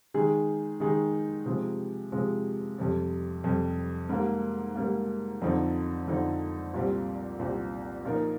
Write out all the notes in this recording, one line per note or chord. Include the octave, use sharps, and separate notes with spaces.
D#3 G#3 D#4 G#4
D#3 G#3 D#4 G#4
C3 F3 G#3
C3 F3 G#3
F2 C3 G3
F2 C3 G3
G#2 G3 A#3
G#2 G3 A#3
F2 D3 F3 C4 D#4
F2 D3 F3 C4 D#4
C2 A#2 G3 C4 G4
C2 A#2 G3 C4 G4
A#2 F3 A#3 D#4 A#4